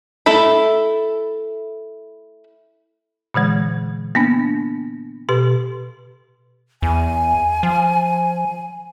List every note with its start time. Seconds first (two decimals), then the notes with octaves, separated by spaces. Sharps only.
0.26 A3 E4 A4 B5
3.34 A#2 D3 E3 G#3
4.15 A#3 B3 D4
5.29 B2 G4 B4
6.82 E2 G#5
7.63 F3